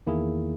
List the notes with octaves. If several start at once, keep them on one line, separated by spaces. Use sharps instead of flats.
E2 D#3 A#3 E4 G#4